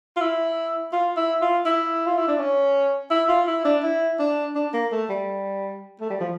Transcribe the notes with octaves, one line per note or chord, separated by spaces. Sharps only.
F4
E4
F4
E4
F4
E4
F4
E4
D4
C#4
E4
F4
E4
D4
E4
D4
D4
A#3
A3
G3
A3
G3
F3